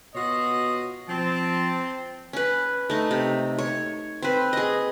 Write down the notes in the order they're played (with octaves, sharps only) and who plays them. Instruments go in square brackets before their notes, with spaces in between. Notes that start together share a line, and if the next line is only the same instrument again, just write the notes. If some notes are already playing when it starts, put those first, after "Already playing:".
[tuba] B2 [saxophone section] F4 F#4 C#5 [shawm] D#5
[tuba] F3 [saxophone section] C4 [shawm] A5
[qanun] C#4 B4
A3 D#4
C3
C#5
C4 B4
G#4 D#5